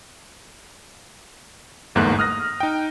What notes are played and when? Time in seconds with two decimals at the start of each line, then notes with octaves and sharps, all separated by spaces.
1.95 G1 E2 G#2 A3 A#3 F#6
2.19 D#6 F6 F#6 A#6
2.60 D#4 G5